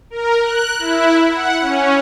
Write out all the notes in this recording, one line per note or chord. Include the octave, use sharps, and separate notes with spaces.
A#4
F#6
E4
F#5
C#4